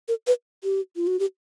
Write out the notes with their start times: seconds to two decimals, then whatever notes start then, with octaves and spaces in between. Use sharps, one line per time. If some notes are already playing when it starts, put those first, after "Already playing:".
0.08 A#4
0.27 B4
0.64 G4
0.96 F4
1.07 F#4
1.19 G4